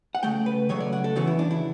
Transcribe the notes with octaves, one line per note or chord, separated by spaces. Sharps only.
F#5
C#3 F#3 A3 G5
B4
C#3 F#3 A3 C#5
D5
F#5
A4
E2 C#3 E3 B3 F#4
E4
D4
E4